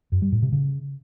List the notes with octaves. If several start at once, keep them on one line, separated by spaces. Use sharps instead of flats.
F#2
G3
A2
C3
C#3